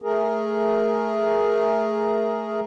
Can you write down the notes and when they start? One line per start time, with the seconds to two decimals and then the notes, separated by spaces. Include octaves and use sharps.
0.02 A3 G#4 A#4